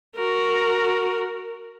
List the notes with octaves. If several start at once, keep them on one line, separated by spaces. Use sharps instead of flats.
F#4 A#4